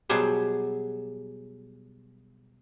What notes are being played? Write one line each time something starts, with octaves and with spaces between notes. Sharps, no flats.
B2 F#3 G3 B3 G#4 C5